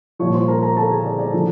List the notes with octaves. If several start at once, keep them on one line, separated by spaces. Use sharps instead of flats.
C2 A#2 F3 C#5 C#6
C5 C6
A#4 A#5
A#4 A#5
A4 A5
G#4 G#5
D5
D5
D3 F3